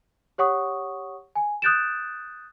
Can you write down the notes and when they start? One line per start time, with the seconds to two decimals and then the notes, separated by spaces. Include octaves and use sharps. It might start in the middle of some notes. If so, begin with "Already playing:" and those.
0.38 G4 C#5 F#5 C#6 D#6
1.35 G#5
1.62 D#6 F#6 G6 A6 D7 E7